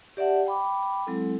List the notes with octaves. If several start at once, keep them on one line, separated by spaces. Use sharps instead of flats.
G4 D5 E5 F#5 A5
G5 B5 D6
F#3 G#3 C4 E4 A4